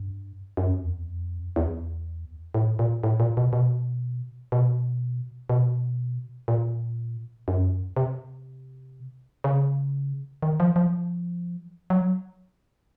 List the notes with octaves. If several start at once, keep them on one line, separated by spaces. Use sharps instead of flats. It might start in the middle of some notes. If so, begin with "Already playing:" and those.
Already playing: G2
F#2
F2
E2
F2
E2
A2
A#2
A2
A#2
B2
B2
B2
B2
A#2
F#2
C3
C#3
D#3
F3
F3
F#3